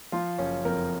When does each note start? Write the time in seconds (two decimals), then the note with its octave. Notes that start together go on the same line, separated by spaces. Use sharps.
0.12 F3 F4
0.38 F#1 C#4
0.65 F2 A#4